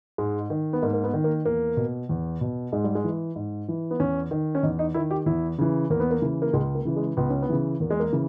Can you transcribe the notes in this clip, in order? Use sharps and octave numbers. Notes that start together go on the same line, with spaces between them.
G#2 G#3
D#3
B3
G#2 A#3
A#3
B3
D#3
A#3
E2 A#3
B2
E2
B2
G#2 G#3
G3
G#3
E3
G#2
E3
B3
E2 C#4
D#3
C#4
E2 D#4
D#4
D#3 E4
G4
E2 E4
C#3 E3
E2 A#3
B3
A#3
C#3 E3
A#3
C#2 G#3
A#3
C#3 E3
G#3
C#2 B3
C#4
B3
C#3 E3
E2 A#3
G#3
A#3
C#3 E3